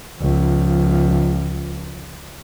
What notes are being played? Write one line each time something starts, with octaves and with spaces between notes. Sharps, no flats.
C#2 F3